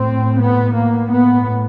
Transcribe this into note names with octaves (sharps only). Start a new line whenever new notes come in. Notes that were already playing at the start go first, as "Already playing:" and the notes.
Already playing: A2 C4
B3
A#3
A2 B3